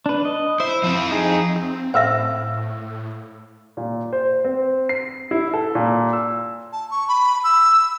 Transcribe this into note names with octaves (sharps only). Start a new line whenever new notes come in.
D4 B4
D#5
E4 C5 E5
F3 C4
D#4 G#4
C4
A2 C5 E5 F5 E6
A#2
C5
C4
C7
E4
A4
A#2
E6
A5
C#6
B5
E6